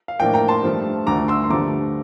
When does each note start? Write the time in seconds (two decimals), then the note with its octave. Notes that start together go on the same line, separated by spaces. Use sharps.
0.08 F5
0.20 A2 F3 A#3 D4 G5
0.34 G5 A#5
0.48 A5 C6
0.63 G2 F3 A3
1.06 D2 D3 A3 A#5 D6
1.28 C6 E6
1.44 C6
1.50 G2 D3 F3 A3 A#5 D6